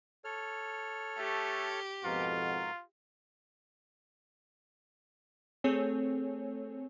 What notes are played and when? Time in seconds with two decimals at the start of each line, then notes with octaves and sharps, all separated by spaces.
0.25 A4 C#5 F6
1.18 A3 G4
2.05 F2 G#2 B2 F4 F#4 A#4
5.64 A3 C4 G#4 A4 C#5 G#5